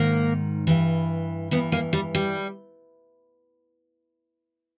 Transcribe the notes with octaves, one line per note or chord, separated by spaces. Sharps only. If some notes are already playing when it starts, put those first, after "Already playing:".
Already playing: G#2 D#3 A#3
G2 E3
G2 E3 B3
A#3
G3
G3